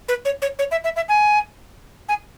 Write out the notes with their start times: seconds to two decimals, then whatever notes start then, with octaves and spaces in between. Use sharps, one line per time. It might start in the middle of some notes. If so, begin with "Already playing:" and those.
0.09 B4
0.25 C#5
0.42 C#5
0.59 C#5
0.71 E5
0.84 E5
0.96 E5
1.09 G#5
2.09 G#5